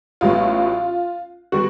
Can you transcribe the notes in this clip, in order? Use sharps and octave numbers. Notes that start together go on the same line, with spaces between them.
A1 A2 F#3 B3 F4
D3 G3 B3 F#4